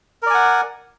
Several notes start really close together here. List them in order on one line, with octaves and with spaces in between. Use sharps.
A#4 D5 G#5 F#5